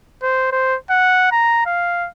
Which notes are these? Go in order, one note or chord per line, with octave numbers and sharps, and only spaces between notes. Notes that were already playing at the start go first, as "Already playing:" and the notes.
C5
C5
F#5
A#5
F5